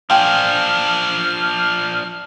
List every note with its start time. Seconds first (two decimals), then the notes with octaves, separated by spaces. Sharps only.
0.10 F3 D4 F4 G5 G#5 F6